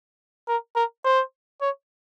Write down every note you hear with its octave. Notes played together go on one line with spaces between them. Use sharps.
A#4
A#4
C5
C#5